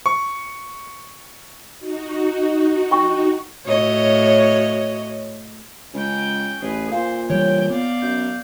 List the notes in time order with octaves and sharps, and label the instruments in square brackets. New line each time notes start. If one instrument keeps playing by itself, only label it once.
[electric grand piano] C#6
[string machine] D#4 F#4
[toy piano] G5 C#6
[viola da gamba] A2 F#4 D#5 [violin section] C#5
[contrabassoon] C#2 [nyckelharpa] C#4 G5
[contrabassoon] A1 [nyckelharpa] G#4 B4
[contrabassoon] A#2 [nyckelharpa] C5 [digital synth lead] F5
[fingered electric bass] E3 G3 [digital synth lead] C#5 [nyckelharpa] G5
[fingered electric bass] B3 [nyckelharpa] D5 F5
[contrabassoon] F#2 [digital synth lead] G6